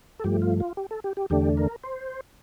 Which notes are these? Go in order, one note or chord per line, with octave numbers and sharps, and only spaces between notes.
A4
G2 F3 A3 G4
F4
F4
G4
A4
G4
G4
E2 D3 A3 D4 G4
A#4
C5